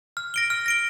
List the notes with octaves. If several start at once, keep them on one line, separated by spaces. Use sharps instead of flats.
F6
A#6 D7 G7
F6
A#6 D7 G7